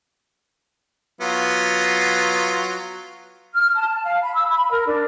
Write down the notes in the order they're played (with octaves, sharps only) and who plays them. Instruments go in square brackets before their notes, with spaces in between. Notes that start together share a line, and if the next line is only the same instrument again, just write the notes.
[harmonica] F#3 B3 F4
[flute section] F6
A5
F5
B5
E6
B5
A#4
D4